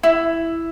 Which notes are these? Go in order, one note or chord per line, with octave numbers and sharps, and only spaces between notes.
E4